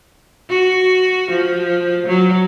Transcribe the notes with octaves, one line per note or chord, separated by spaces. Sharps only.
F#4
F3
F#3